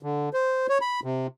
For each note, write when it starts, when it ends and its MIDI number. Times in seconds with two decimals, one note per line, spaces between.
0.03 0.29 50
0.33 0.67 72
0.69 0.78 73
0.81 1.00 83
1.04 1.27 48